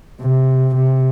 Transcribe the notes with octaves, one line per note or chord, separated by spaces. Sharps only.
C3
C3